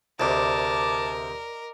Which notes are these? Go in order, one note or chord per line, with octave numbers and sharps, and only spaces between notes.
D2 C3 A#4 D5 D#5 A5